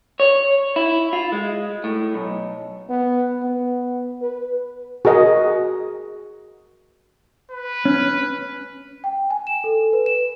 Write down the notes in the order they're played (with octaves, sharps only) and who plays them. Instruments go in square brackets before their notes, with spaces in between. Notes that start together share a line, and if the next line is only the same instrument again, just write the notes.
[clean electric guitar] C#5
E4
F4
G#3
A2
B1
[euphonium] B3
B3
B4
[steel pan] F#4 G#4 A#4 D#5
[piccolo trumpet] B4
[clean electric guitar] C#4
[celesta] G5
G#5
E7
A4
B4
E7